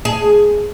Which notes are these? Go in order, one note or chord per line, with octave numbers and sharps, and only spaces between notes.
G#4